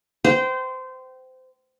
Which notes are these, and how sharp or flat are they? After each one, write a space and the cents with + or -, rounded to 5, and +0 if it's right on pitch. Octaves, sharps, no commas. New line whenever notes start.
C5 -20 G5 -25